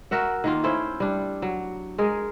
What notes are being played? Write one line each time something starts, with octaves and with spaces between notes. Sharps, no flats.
F#4 A#4 E5 F#5
D#3 A#3 F4
A3 C#4 E4 C5
G3 D4
F#3
G#3 G#4 A#4